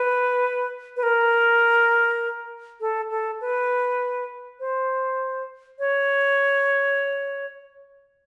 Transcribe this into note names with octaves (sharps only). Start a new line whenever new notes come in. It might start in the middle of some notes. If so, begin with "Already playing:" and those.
Already playing: B4
B4
A#4
A4
A4
B4
C5
C#5